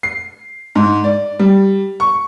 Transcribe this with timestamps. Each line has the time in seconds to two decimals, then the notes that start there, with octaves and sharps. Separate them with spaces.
0.03 C7
0.75 G#2
1.04 D5
1.39 G3
2.00 C#6